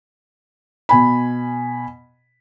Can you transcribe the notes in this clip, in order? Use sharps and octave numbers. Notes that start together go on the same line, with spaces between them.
B2 G#5 B5